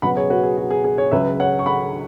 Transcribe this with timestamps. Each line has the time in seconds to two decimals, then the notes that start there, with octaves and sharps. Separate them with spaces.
0.02 C#2 B2 F#3 F#5 B5
0.17 G#4 C#5
0.30 F#4 B4
0.43 G#4
0.57 F#4
0.70 G#4
0.84 G#4
0.98 G#4 C#5
1.11 C#2 C#3 F#3 B4 E5
1.40 C#5 F#5
1.59 C#6
1.66 F#5 B5